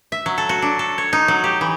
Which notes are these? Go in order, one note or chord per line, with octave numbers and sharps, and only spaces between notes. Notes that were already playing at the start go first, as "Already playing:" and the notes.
E5
F#3
A4
F#4
D4
A4
C#5
D#4
F#3
G4
E3